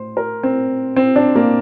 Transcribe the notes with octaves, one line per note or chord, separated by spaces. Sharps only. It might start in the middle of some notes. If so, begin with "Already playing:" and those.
Already playing: A2 C5
A#4
C4
C4
D4
A#3